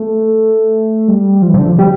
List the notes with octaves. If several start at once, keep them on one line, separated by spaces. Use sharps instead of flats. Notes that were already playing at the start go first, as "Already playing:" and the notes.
Already playing: A3
G3
F3
E3
C3
D3
F3
G3